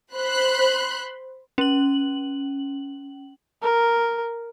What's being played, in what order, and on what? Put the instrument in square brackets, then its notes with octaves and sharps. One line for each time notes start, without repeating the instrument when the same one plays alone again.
[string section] C5 B5 C6 F#6
[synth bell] C#4 F#7
[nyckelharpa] A#4